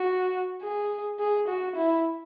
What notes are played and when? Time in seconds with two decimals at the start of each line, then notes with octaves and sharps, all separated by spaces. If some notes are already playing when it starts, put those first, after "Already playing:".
Already playing: F#4
0.62 G#4
1.19 G#4
1.48 F#4
1.76 E4